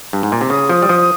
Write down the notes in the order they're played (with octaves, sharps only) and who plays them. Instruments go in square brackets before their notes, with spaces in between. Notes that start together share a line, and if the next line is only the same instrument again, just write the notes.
[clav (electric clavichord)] G2
G#2
A#2
C3
[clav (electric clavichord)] C#3 [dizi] D#6
[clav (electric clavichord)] F3
G3
F3